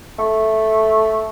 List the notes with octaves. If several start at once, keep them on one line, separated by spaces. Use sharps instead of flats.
A3